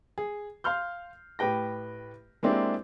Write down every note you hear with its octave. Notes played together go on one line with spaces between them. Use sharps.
G#4
F5 C6 F6 G6
A2 G4 B4 G5 A#6
G#3 A#3 C4 D4 E4 G4